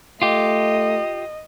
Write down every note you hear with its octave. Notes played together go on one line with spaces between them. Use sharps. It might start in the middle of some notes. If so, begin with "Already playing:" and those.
A3 F4 G4 D#5